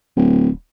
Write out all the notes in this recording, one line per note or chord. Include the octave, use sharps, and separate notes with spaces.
D1